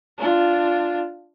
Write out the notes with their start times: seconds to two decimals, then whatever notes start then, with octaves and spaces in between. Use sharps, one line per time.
0.18 D4 F4